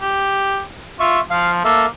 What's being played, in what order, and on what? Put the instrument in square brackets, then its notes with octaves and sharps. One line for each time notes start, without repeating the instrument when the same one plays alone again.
[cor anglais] G4
[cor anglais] F4 [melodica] E5 C#6
[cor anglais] F3 [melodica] F5
[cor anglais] A#3 [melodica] A4 E5